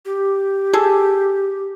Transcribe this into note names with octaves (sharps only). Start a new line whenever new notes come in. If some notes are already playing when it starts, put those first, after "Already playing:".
G4
G#4 A4